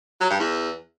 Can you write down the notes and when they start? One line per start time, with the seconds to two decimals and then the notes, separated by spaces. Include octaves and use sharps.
0.21 F#3
0.30 G2
0.40 E2